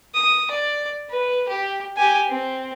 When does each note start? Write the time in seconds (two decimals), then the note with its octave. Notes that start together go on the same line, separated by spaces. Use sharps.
0.14 D#6
0.51 D5
1.10 B4
1.48 G4
1.97 G4 G#5
2.30 C4